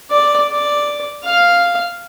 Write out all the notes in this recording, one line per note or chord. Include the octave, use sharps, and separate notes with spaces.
D5
D5
F5